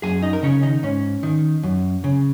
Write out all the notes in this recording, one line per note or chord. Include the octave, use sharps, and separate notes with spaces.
F#2 G#4 G#5
D#4 D#5
A#4
C#3 C#4 C#5
D#3 D#4
G#2 C#4
D#3
F#2
C#3